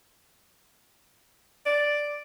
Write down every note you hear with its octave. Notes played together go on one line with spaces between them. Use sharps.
D5